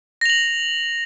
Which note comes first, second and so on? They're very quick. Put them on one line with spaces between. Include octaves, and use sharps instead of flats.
A#6 F7 F#7